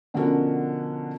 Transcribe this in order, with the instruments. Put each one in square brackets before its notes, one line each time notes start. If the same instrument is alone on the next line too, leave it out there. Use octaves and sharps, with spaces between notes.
[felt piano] B2 D3 F3 C#4 F#4 A#4